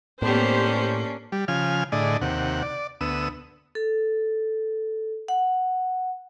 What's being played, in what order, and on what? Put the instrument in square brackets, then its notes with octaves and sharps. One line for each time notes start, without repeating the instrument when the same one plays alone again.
[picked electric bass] A2 [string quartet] A#3 C#4 D4 [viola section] B3 G4 C5
[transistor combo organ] G3
C#3 F3 G#5 F6
A2 D3 G#4 D5 D#5
D#2 C3 F#5
D5
D2 B3 D#6 E6
[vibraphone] A4
F#5